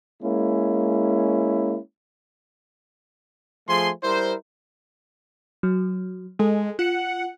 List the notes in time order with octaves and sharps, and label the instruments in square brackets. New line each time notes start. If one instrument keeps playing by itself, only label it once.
[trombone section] G#3 A#3 C#4 E4
[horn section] F3 A3 G#4 G#5 C6
G3 E4 A#4 C5
[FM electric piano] F#3
[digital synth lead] G#3 [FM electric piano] A4
[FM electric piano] F4 C#7 [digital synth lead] F#5